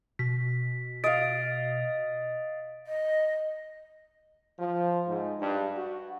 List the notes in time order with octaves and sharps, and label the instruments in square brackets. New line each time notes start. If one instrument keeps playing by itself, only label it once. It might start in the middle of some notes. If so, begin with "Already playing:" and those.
[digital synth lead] B2 [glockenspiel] B6
[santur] D#5 F5 [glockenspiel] A6 D7
[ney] D#5
[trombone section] F3
G#2
G2
F#4